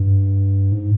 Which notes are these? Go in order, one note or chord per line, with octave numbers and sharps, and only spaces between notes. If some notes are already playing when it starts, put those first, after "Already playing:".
Already playing: G2
G#2